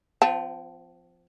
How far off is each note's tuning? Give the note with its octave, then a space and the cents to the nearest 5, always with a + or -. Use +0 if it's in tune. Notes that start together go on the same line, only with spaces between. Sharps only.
F3 +0 C4 -40 A5 +0